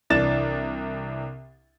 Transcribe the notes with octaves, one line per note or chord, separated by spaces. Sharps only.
C2 E3 D4 A6 E7